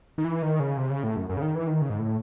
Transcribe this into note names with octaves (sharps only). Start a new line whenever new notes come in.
D#3
E3
D#3
C#3
C3
C#3
A2
F#2
F#2
C#3
D#3
E3
D#3
C#3
G#2
A2